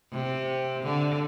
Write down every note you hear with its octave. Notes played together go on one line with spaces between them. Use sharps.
C3
D3